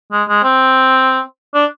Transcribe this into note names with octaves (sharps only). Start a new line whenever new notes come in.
G#3
G#3
C4
D4